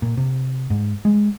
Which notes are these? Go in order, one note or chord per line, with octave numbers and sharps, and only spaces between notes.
A#2
C3
G#2
G#3